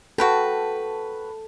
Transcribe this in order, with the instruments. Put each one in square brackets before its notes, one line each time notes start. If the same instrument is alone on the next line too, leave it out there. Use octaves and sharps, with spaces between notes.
[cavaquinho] F#4 B4 G5 [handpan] A4